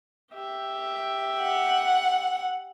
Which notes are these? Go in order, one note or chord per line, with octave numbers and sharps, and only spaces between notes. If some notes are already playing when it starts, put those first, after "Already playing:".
G4 E5
F#5